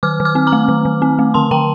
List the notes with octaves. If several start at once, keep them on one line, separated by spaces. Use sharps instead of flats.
D#3 D6 F6
D#3
D6 F6
C4
A#5 D6
A3
D#3
D#3
C4
A3
D3 A5 C6
D3 G5 A#5